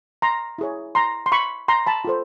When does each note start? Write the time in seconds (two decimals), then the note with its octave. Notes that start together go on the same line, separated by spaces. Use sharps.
0.22 A#5 C6
0.58 E4 G#4 C#5
0.95 A#5 C6
1.26 C6
1.32 B5 C#6
1.68 A#5 C6
1.86 A5 B5
2.05 F4 A4 C5